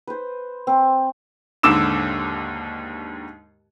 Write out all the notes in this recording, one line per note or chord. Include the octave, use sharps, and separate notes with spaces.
B4 C5
C4
D#2 G#2 D3 D6 E6 E7